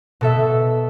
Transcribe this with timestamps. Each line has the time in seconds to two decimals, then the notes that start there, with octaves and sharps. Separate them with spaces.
0.21 B2 A4 E5